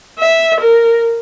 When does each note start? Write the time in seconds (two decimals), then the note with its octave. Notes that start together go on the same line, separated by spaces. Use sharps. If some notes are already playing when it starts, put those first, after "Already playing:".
0.19 E5
0.60 A#4